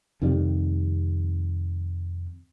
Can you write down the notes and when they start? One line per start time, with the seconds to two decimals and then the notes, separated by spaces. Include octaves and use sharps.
0.22 F2 C3 D#3 G3